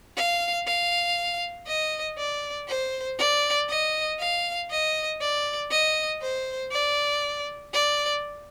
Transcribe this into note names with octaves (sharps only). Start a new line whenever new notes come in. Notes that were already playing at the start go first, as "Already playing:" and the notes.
F5
F5
D#5
D5
C5
D5
D#5
F5
D#5
D5
D#5
C5
D5
D5